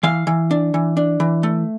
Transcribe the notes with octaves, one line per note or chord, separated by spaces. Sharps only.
E3 F5
E3
D4
E3
D4
E3
A3